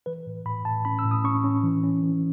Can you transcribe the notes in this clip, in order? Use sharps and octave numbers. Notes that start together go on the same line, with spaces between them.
E3 B4
A2
A2 B5
A2 A5
C#4 B5
E6
A2
D#6
C#4 C#6
C#4
E3
C#4
E3